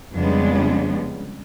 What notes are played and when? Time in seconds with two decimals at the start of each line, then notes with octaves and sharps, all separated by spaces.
0.12 F2 C#3 G3 G#3 B3 D4